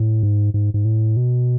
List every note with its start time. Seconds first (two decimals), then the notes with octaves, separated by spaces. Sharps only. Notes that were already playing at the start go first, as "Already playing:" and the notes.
Already playing: A2
0.23 G#2
0.54 G#2
0.74 G#2
0.85 A2
1.17 B2